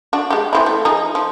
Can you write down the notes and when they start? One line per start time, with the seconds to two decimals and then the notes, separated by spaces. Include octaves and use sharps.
0.13 D4 F#4
0.30 G#3 G4
0.53 E3 C4 E4
0.66 A3
0.85 F3 D#4 G#4
1.15 F3